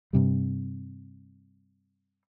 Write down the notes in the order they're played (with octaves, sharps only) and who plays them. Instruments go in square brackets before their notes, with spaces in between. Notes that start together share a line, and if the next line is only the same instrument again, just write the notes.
[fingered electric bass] G2 C3 G3